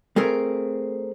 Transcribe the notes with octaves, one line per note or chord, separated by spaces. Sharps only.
A3 C4 G#4 A#4